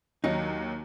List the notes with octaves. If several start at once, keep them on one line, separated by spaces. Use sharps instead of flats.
D#2 F#3 D#4